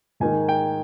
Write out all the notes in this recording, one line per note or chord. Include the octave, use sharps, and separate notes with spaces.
G#2 D#3 A#3 D#4 G#5
G5